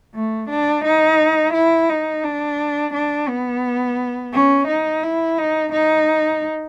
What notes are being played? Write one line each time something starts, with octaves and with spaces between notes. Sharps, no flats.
A3
D4
D#4
E4
D#4
D4
D4
B3
C#4
D#4
E4
D#4
D#4